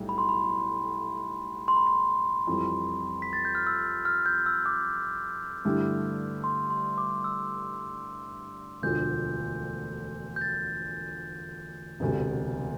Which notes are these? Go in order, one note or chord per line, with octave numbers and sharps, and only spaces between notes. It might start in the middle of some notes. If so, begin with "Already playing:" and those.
Already playing: B1 A2 G3
B5
C6
B5
C6
B5
C6
F2 E3 G3
B6
A6
G6
F6
E6
F6
G6
E6
D6
G2 D3 A3 E4 G4
C6
C6
D6
E6
E1 D2 D3 F3 G6
G6
A6
E1 D2 C3